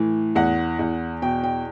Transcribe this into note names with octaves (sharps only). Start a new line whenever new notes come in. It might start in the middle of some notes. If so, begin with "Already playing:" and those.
Already playing: A2 E3
E2 F#5
E2
B2 G5
G5